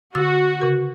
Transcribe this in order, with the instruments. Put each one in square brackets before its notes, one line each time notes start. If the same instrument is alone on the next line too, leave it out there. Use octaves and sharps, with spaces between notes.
[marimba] D3 E6 A6 [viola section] F#4
[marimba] C#3 A#4